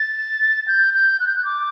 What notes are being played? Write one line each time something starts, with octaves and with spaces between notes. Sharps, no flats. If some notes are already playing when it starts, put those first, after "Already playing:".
Already playing: A6
G6
G6
F#6
G6
F#6
D6